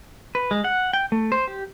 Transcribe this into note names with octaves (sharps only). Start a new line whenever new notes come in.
B4
G#3
F#5
G5
A3
C5
G4